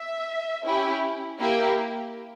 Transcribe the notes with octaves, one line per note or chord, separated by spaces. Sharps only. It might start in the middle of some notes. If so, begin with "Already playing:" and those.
Already playing: E5
C#4 E4 G4
A#3 E4 G4